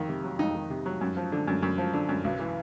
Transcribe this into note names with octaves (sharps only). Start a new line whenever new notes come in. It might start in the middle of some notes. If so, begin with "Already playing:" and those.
Already playing: F2 D#3
C3
F#3
F2 D#4
D#3
C3
F#3
F#2
F3
D3
F#2
F#2
F3
D3
F#2
B1
E3